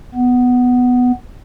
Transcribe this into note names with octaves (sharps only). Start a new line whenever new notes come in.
B3